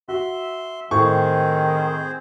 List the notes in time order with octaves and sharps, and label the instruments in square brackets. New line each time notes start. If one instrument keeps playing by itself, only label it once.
[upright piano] F#4 [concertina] E5 C6
[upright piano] A2 C#6 [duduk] D#3 [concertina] C4 G#4 C5